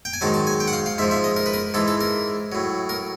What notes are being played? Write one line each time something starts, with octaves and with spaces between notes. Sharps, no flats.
G5
G#5
G#2 D#3 F#3 A5
A5
G#5
G5
F#5
F5
F5
G#2 F3 E5
E5
D#5
A#4
B4
A#4
G#2 E3 A4
A4
A#4
A2 F#3
A#4